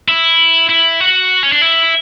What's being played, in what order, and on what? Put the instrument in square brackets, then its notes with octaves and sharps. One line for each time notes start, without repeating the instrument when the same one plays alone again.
[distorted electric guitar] E4
E4
F#4
C#4
D4
E4